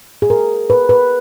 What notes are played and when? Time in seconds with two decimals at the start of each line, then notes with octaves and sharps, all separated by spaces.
0.22 G#4
0.30 A#4
0.70 B4
0.89 B4